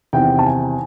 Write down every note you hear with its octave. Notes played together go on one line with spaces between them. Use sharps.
E2 C3 D#3 G5
A5
G#5